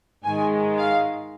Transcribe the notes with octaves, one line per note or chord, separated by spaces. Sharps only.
G#2 D#3 G#3 G#5
F5